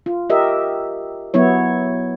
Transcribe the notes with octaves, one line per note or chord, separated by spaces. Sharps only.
F4
G4 A#4 D#5 E5
F#3 B3 E4 C#5